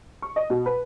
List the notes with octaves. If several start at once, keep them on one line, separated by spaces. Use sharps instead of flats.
C#6
D#5
B2
B4